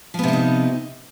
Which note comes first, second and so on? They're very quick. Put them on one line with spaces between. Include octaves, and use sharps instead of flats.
F3 B3 C3 D4 D#4